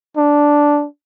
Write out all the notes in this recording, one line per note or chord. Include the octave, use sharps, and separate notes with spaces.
D4